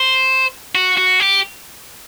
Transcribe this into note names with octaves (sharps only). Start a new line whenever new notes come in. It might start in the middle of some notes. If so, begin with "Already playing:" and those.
Already playing: C5
F#4
F#4
G4